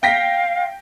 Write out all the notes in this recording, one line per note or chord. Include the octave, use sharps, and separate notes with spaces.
F5 G5 A#6 B6